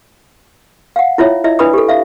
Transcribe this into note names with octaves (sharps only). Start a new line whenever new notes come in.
F5 F#5
E4 F4 C#5 E5
E4 D#5 E5
D4 E4 B4 D5 B5 D#6
G4 A4
E5 F5